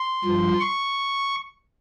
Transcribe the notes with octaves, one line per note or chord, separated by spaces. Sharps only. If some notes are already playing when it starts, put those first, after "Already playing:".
Already playing: C6
G2 F3
C#6